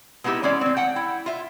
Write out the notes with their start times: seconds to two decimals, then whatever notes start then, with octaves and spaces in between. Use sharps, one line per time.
0.24 G#3 B3 D#4 E4 G4
0.43 E3 G#3 C#4 D5
0.61 D#3 C4
0.77 F#5 G5
0.96 E4
1.26 F4 E5